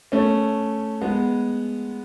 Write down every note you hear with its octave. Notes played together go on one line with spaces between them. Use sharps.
A3 C#4
G#3 B3